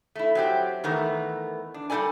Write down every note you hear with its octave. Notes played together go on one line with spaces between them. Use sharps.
A3 E4
F#3 C4 G4
D#3 E3 A3 B3 A#4
D4
G3 A#3 D#4 A4 D5 G#5